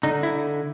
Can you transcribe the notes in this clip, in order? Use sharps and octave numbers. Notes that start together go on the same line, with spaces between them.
D3 D#4
E4